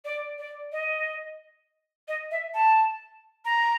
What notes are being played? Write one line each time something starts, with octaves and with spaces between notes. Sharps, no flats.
D5
D5
D#5
D#5
E5
A5
A#5